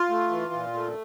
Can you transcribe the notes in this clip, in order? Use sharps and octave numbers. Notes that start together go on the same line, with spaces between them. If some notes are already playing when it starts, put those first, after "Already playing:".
Already playing: F4
A3
E3
A#2
A3